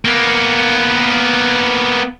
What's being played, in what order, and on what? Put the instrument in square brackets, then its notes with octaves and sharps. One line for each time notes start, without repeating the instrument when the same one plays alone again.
[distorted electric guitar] A#3 B3